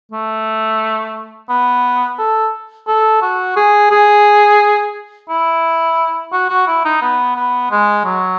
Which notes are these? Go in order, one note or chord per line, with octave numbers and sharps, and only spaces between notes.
A3
B3
A4
A4
F#4
G#4
G#4
E4
F#4
F#4
E4
D#4
B3
B3
G#3
F#3